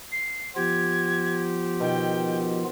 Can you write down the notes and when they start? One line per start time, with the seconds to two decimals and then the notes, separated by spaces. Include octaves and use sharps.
0.12 C7
0.56 F3 B3 F4 G4 G#6
1.80 B2 D#3 G5